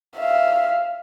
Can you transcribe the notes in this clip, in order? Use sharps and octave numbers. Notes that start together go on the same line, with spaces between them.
E5 F5